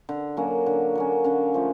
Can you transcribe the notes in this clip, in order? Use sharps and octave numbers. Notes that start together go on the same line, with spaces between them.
D3
F#3 A#3 C#4
D3
F#3 A#3 C#4
D3 C#4
F3 A3